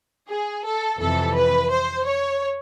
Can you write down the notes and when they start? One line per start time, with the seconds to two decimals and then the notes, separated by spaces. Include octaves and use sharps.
0.28 G#4
0.64 A4
0.99 F2 C3 E3 A4
1.36 B4
1.70 C5
2.06 C#5